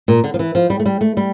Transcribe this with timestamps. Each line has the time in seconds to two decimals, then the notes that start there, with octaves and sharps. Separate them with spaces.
0.08 A#2
0.24 D3
0.34 F3
0.39 E3
0.55 F3
0.70 G3
0.80 A3
0.86 G3
1.01 A3
1.17 G3